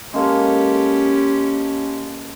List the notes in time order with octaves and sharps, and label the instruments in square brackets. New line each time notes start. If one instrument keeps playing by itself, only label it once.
[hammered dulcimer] G#3 A#3 A4 [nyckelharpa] C#4 G4